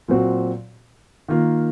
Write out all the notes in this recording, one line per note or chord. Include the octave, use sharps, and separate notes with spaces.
A#2 F#3 C4 F#4
D#3 A#3 F4